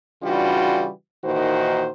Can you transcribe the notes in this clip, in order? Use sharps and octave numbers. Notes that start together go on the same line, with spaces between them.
C#3 E3 G3 D4 F4 F#4
A#2 D#3 E3 D#4 F#4 C5